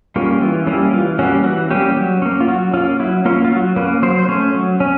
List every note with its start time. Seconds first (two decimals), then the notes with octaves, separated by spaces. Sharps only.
0.16 G3 A#3 C#4 F4
0.41 E3 F4
0.67 G3 A#3 C#4 E4
0.93 E3 F4
1.19 G3 A#3 C#4 F#4
1.44 E3 F#4
1.71 G3 A#3 C#4 G4
1.96 F#3
2.22 A#3 C#4
2.41 F4
2.48 F#3 F#4
2.73 C#4 F4
2.77 A#3
3.00 F#3 E4
3.25 A#3 C#4 F4
3.45 F4
3.51 F#3 F#4
3.76 A#3 C#4 B4
4.02 F#3 C5
4.19 C5
4.29 A3 C#4 C#5
4.54 F#3
4.80 C#4